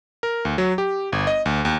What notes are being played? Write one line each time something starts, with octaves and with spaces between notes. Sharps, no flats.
A#4
D2
F#3
G4
G1
D#5
D2
D#2